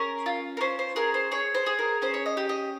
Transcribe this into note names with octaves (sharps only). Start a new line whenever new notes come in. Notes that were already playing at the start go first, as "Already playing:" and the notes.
Already playing: C#4 G#4 A#4
F4
A#4
C#4 C5
C5
G#4 A#4
C5
G#4 C#5
C5
G#4
A#4
C#4 C5
C#5
D#5
G4
D#5